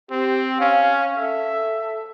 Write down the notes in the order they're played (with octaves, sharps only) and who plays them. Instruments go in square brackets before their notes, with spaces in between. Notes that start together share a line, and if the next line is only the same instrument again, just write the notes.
[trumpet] C4 [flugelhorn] G4
[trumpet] C#4 [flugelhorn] F5
[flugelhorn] A4 [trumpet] E5